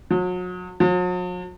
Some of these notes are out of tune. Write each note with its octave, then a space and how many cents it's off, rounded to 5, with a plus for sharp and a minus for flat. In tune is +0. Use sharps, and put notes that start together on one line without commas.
F#3 -35
F#3 -45